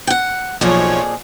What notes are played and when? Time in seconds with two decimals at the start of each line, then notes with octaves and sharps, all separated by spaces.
0.07 F#5 G5
0.61 B1 F2 A#2 F3 G#4 C#5